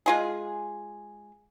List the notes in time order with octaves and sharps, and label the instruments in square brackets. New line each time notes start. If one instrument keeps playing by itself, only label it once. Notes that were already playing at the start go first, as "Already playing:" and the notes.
[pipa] G#3 F4 G#4